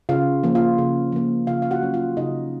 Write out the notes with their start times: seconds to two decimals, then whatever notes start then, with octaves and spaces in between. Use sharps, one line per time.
0.09 C#3 F4 F5
0.44 F3 A#3
0.55 F4 F5
0.78 C#3
1.12 F3 A#3
1.47 C#3 F4 F5
1.62 F5
1.71 F#4 F#5
1.82 F#3 A#3 C#4
1.94 F4 F5
2.17 C#3 D#4 D#5